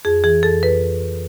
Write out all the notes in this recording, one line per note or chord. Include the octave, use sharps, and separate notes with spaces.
F2 G#4
E3 G#4
F2 A4
F2 B4